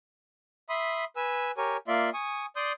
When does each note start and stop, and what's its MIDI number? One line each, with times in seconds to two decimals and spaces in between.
0.69 1.05 76
0.69 1.05 83
0.69 1.05 84
0.69 1.05 87
1.16 1.51 71
1.16 1.51 80
1.16 1.51 88
1.57 1.77 67
1.57 1.77 70
1.57 1.77 73
1.57 1.77 80
1.88 2.10 58
1.88 2.10 65
1.88 2.10 74
1.88 2.10 76
1.88 2.10 84
2.14 2.46 80
2.14 2.46 85
2.14 2.46 87
2.56 2.72 74
2.56 2.72 84
2.56 2.72 87
2.56 2.72 91